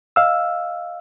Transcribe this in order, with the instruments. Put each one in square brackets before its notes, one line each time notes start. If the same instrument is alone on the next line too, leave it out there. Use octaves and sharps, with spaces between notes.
[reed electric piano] D#5 F5 E6